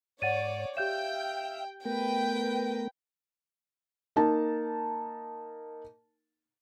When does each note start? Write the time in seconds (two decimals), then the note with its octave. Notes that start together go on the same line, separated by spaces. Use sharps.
0.22 G#2 C#5 D5 F#5 A6 D#7
0.77 G4 E5 F5 G5 G6 E7
1.85 A3 B3 A#4 B4 G5
4.16 A#3 D#4 A5